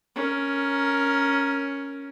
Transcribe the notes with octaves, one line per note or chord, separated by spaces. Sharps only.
C#4 A#4